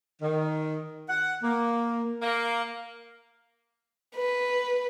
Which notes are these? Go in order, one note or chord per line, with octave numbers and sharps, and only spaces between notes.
D#3
F#5
A#3
A#3
B4